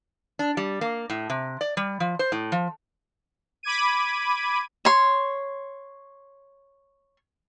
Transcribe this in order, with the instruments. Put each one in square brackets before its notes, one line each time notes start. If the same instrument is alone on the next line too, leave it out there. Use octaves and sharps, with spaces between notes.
[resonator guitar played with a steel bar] D4
G3
A#3
A2
C3
D5
G3
F3
C5
A2
F3
[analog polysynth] B5 D6 G#6 D#7
[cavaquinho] C#5 C6